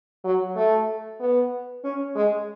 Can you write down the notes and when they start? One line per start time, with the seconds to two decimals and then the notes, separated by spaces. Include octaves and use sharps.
0.24 F#3
0.56 A3
1.20 B3
1.84 C#4
2.16 G#3